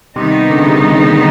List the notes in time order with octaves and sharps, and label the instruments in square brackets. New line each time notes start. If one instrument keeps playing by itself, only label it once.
[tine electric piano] C3 [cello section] D#3 G3 B3 D#4
[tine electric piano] D3
C#3
C3
C#3